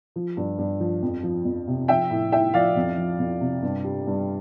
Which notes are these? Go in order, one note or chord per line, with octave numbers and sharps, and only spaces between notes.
F3
G2
G2
F3
F2
F3
F2
C3
F3 E5 G5
A2
A2 E5 G5
F3 D5 F5
F2
F3
F2
C3
G2
G3
G2